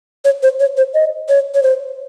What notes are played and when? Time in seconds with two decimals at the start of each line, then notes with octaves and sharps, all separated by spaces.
0.25 C#5
0.43 C5
0.60 C#5
0.77 C5
0.94 D#5
1.29 C#5
1.55 C#5
1.63 C5